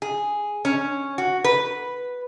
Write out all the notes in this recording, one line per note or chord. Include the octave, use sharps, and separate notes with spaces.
G#4
C#4
F#4
B4